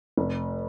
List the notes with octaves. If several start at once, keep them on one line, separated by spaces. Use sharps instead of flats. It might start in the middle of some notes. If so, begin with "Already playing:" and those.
F1